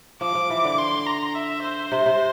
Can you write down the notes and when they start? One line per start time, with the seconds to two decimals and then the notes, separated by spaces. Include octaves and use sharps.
0.21 F3 D6
0.35 F3
0.50 E3
0.65 D3
0.78 C6
1.06 A#5
1.35 E5
1.63 C5
1.92 C3
2.06 C3